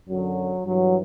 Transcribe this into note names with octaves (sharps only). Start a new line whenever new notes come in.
F#2 D3 F#3
G2 E3 F#3